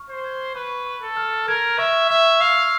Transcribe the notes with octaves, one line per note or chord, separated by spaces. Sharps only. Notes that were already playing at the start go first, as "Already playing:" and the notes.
Already playing: C#6 F6
C5
G#6
B4 C#6
C#6
A4
F6
A#4 G#6
E5 C#6
E5 C#6
F5 E6